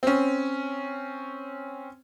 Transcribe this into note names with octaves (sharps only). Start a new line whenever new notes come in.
C4 C#4